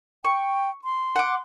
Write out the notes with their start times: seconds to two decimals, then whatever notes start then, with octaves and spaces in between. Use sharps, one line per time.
0.25 G5 C#6
0.84 C6
1.16 F#5 D6